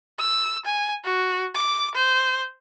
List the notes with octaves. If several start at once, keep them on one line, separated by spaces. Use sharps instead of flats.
E6
G#5
F#4
D6
C5